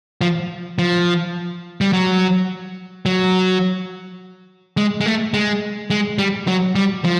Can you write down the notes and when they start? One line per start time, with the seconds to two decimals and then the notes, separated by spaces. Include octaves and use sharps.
0.21 F3
0.79 F3
1.81 G3
1.93 F#3
3.06 F#3
4.77 G#3
5.01 G#3
5.06 A3
5.34 G#3
5.90 G#3
6.18 G3
6.47 F#3
6.75 G3
7.05 F3